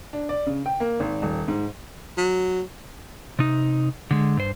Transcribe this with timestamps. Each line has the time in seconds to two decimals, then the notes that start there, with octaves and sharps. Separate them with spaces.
0.13 D4
0.29 D5
0.46 C#3
0.66 G5
0.80 A#3
1.00 G#1
1.22 D#1
1.48 G#2
2.17 F#3
3.39 C3 D#4
4.11 D3 G#3
4.37 G2 C5